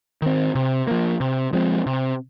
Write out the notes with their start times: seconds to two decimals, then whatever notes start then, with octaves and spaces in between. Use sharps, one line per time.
0.22 D#3 C4
0.55 C3
0.87 F3 A#3
1.20 C3
1.53 F3 G#3 C4
1.86 C3